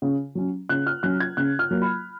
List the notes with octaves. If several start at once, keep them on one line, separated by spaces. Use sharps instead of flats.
C#3
F#3 C#4
C#3 F#6
F6
F#3 C#4 F#6
G#6
C#3 F#6
F6
F#3 A#3
B5